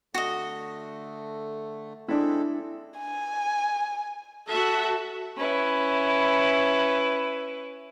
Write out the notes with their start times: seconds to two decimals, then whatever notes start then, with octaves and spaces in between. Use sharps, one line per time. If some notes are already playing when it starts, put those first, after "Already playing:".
0.14 D3 A3 F#4 D#5
2.08 G#3 C4 D4 E4 A4
2.98 G#5
4.48 F#4 A4 E5
5.38 C#4 E4 B4